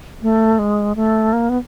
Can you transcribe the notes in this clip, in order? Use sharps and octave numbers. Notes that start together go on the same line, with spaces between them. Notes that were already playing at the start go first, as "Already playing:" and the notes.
A3
G#3
A3
A#3
B3